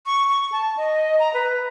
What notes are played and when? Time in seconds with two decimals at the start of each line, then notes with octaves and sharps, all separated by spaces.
0.06 C#6
0.29 C#6
0.52 A5
0.77 D#5
1.19 A#5
1.34 B4